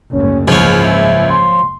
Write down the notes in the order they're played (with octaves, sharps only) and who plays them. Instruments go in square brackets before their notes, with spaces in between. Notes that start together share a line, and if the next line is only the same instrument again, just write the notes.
[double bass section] F#1 D2 G#2 [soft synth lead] C#4
[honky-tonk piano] C#2 [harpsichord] F3 C#4 [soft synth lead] F5
[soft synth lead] E5
C6